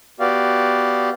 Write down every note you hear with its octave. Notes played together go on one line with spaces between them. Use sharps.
B3 F#4 G4 D5 F5